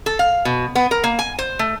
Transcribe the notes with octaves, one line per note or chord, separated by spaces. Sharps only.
A4
F5
B2
B3
A#4
A#3
G#5
C5
A3